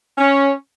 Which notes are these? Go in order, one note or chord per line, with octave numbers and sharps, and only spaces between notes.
C#4